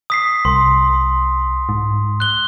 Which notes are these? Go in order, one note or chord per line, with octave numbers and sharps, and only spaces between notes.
D#6 B6 C7
C2 C6
G#2
F#6 G7